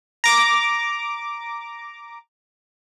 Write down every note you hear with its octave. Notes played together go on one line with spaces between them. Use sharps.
A#5 D6